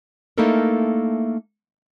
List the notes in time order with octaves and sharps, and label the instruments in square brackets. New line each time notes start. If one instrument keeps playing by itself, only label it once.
[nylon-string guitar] A3 A#3 D#4 E4 A4 A#4